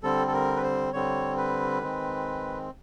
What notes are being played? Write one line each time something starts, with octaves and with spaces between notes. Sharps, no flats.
D3 G3 C4 A4
A4
A#4
B4
C5
D3 G3 C4 C#5
B4
D#3 G#3 C4